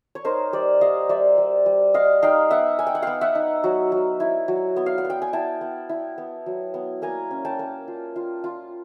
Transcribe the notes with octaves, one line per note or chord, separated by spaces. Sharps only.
C#5
D#4 A#4 C5
G3 C5 D5
G3 D#5 F5
G3 D5 E5
G3
G3
G3 D#5 F5
D#4 F5 G5
B3 E5 F#5
D#4 G#5
G5
F#5
B3 F5 G5
E5 F#5
D#4
F#3
F#3
E4
F#3
B3
F5
F#5
B3
G5
G#5
E4 G5 A5
B3
E4
B3
F#3
B3
A#3 G#5 A#5
C#4
G5 A5
A#3
F4
F4
F4